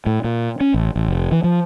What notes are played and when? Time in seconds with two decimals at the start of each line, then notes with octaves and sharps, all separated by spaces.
0.06 A2
0.24 A#2
0.60 C#4
0.74 A1
0.96 A1
1.08 F1
1.32 E3
1.44 F3